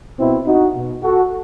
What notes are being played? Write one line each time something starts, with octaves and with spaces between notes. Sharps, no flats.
B2 C4 E4
D#4 F#4
B2
F#4 A4